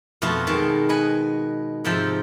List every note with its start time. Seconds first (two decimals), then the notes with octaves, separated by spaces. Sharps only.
0.22 F2 B2 A3 F4 F#4 A5
0.47 B2 D#3 G#3 A5
0.89 B4 D#5 F#5 G#5
1.85 G#2 C3 F3 E5 G5 A5